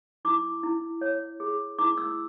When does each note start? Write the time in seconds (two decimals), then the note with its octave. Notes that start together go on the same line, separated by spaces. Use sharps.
0.25 E4 D6
0.63 E4
1.01 C#5
1.40 G#4
1.79 E4 D6
1.97 E6